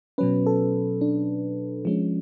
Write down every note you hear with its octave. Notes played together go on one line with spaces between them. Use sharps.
B2 F#3 C#4 B4
A4
D4
F3 G#3 C#4